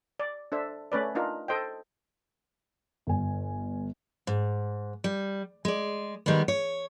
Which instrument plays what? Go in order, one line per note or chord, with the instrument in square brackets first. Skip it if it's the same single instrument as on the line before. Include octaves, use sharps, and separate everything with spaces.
[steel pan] D5
D4 A4 C5 E5
A3 C#4 B4 D5
D4 D#4 F4 A#4
A4 C5 D#5 G5
[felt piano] G1 G#5
[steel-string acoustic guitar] G#2
G3
G#3 D5
D#3 G3 G#3 B3
C#5